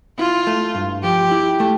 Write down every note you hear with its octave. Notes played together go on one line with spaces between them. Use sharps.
E4 F4
A3
G2
F3 G4
E4
A3